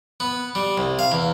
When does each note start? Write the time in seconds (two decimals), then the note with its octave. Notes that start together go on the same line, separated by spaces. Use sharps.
0.20 B3
0.55 G3
0.78 C2
0.99 F5
1.12 E2